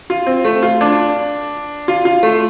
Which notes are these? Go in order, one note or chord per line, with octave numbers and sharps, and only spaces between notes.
F4
C4
A3
F4
D4
F4
F4
A3